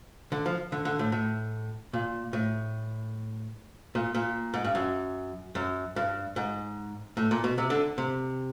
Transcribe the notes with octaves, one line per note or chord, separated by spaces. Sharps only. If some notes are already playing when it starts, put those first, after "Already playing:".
D3
F3
D3
D3
A2
A2
A#2
A2
A#2
A#2
G#2
G2
F#2
F#2
G2
G#2
A2
A#2
B2
C3
D3
C3